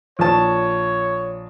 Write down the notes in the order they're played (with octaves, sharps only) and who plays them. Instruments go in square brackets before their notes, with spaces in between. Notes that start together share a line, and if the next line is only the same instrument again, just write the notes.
[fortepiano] A#1 A5 [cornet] C#5